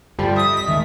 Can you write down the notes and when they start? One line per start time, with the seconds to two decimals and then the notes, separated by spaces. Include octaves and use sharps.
0.19 G2 D3 F3 G3 C4
0.36 E5 D#6 D#7
0.53 D#5 B6
0.67 A1 D#2 D#3 G#3 A3 E5